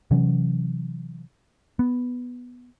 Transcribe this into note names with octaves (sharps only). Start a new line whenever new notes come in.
C3 E3 F#3 C#4
B3